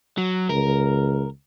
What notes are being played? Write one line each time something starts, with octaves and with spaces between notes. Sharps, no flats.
F#3
C#2 A#4